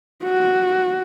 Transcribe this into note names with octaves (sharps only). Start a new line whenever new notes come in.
F#4